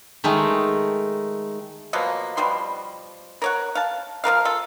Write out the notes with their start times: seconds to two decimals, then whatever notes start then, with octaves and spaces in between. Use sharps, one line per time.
0.24 D#3 G#3 A3 D#4
1.93 B2 F3 F#3 A#3
2.37 B2 F3 G3 C6
3.42 A#4 C#5 F#5
3.75 F5 A5
4.24 F3 C4 A#4 F5
4.45 F4 A4